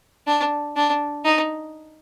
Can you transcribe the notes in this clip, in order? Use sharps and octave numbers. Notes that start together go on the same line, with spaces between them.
D4
D4
D#4